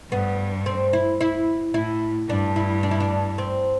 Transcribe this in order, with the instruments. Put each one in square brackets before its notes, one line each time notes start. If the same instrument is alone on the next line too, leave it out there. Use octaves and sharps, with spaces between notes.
[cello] G2 [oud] B3
[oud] C4
E4
E4
[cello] A2 [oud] E4
[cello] G2 [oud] D4
[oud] E4
D4
E4
D4
C4